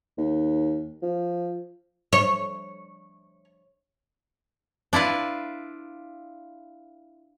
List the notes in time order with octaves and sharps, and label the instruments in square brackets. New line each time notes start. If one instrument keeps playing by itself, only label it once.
[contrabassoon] D#2
F3
[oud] C#5
[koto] D4 E4 F4 B4